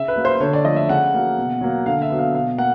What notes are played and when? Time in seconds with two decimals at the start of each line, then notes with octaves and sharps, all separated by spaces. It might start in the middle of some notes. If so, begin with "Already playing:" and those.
Already playing: C#3 E5
0.08 B4
0.16 F#3 A#3
0.25 C5
0.40 D3 C#5
0.53 D5
0.64 F3 A3 D#5
0.76 E5
0.89 C#3 F#5
1.14 F#3 A#3
1.37 B2
1.61 F#3 A#3
1.86 D3 F5
2.02 E5
2.10 F#3 B3
2.19 F5
2.34 B2 F5
2.58 A#3 F#5